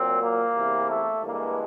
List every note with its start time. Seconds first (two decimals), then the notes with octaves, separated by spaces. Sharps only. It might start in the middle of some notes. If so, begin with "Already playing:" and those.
Already playing: A#2 F#3 C4
0.22 A#3
0.56 E2 C3 E3
0.90 A3
1.23 G2 E3 G#3 A#3